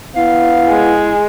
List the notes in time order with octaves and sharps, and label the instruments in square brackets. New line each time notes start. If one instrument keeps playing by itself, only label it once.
[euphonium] B3 [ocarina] E4 [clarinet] F5
[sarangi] G#3